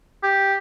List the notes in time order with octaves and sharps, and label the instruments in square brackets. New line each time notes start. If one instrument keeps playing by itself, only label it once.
[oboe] G4